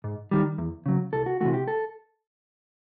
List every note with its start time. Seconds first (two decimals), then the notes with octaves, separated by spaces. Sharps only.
0.04 G#2
0.31 D#3 G3
0.58 E2
0.86 C#3 F#3
1.13 C2 A4
1.26 F#4
1.41 C3 E3 A3 F#4
1.54 G4
1.68 A4